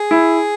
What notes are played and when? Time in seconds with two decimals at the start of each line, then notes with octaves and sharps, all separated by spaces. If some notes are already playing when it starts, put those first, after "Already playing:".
Already playing: G#4
0.11 E4